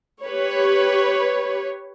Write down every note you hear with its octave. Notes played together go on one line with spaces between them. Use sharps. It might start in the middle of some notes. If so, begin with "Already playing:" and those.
G4 B4 C#5